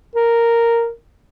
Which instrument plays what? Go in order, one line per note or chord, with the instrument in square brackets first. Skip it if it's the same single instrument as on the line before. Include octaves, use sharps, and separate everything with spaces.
[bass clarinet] A#4